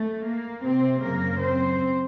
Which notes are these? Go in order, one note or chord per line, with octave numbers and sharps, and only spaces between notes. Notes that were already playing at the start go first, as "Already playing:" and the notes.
Already playing: A3
A#3
C3 C4
F#2 C#3 F#3 A#3 A#4
C4 C5